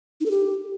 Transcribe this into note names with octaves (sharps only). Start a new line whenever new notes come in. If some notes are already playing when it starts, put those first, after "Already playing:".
D#4
A4
G4